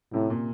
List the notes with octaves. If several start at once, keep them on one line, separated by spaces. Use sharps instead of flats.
A2 C3
A#2